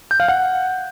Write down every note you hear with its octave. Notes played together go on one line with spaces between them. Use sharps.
G6
F5
F#5